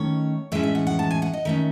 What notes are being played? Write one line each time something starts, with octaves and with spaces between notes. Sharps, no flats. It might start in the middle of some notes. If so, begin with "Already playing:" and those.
Already playing: D#3 A3 C#4 C#5
A2 E3 G#3 C#4 E5
E5
F#5
F#5
A5
G#5
F#5
D#5
D#3 A3 C#4 E5